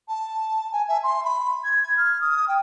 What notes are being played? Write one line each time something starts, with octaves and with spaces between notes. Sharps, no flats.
A5
G#5
E5
C6
B5
G#6
G#6
F6
D#6
G5